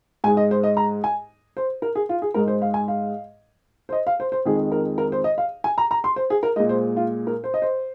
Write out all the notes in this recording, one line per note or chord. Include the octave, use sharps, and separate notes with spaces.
G#2 G#3 G#5
D#5
C5
D#5
A#5
G#5
C5
A#4
G#4
F4
G#4
G#2 G#3 A#4
C5
F5
G#5
F5
C5
D#5
F5
C5
C5
F2 D#3 G#3 G#4
A#4
A#4
C5
D#5
F5
G#5
A#5
A#5
C6
C5
G#4
A#4
A#2 G#3 D#5
C5
F4
A#4
C5
D#5
C5